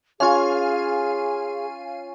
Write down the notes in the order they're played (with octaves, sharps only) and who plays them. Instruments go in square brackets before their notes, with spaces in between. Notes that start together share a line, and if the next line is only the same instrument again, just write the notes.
[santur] C#4 F4 [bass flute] G#4 [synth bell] F5 G#5